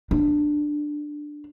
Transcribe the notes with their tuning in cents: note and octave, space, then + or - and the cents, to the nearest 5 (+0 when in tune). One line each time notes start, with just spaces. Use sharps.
D4 +10